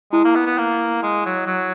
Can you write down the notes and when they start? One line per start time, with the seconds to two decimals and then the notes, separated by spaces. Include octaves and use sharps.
0.12 G#3 E4
0.25 A#3
0.36 B3
0.46 B3
0.58 A#3
1.03 G#3
1.26 F#3
1.47 F#3